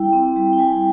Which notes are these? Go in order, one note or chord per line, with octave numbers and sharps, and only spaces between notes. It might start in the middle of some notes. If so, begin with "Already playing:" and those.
Already playing: G3 E4 G5
C4
G3
G5
G3 G#5